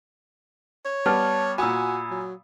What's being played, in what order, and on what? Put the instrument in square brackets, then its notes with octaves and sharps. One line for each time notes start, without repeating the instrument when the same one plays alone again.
[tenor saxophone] C#5
[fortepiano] G3 B3 F6 [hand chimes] A5
[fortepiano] A#2 G#5 [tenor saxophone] F#4 [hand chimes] B5 D#6 E6
[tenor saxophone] F#3